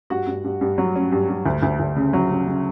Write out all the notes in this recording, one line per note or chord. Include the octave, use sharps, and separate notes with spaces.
G2 F#4 F#5
G2
G2
G2
F#3
C#4
G2
G2
D2
D2
D2
C#3
F#3
C#3
C#3